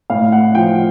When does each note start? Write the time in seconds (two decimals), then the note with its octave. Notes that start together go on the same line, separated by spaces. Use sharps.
0.10 A2 F5
0.32 F#5
0.55 F3 G5